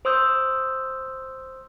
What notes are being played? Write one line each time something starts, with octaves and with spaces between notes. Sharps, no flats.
C5 C6 D#6 E6 G6